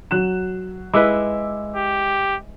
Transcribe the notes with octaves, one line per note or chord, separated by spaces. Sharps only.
F#3 F#6 E7
G#3 E4 B4 D6 E6
G4